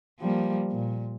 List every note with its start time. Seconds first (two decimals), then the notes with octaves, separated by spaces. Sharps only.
0.20 F3 G3 A#3
0.71 A#2